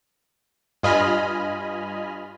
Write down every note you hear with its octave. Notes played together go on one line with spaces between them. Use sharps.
G2 F4 D#5 G#5 B5 F6